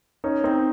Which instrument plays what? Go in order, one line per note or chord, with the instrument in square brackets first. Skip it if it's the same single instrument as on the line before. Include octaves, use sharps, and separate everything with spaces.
[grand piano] C#4 [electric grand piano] D#4
[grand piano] C4 [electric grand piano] D#4